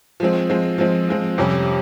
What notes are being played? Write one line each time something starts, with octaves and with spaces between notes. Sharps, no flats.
F3 G#3 C4
F3 G#3 C4
F3 G#3 C4
F3 G#3 C4
F2 C3 G3 C#4